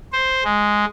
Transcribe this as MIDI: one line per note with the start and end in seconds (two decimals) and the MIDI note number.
0.13 0.44 72
0.45 0.85 56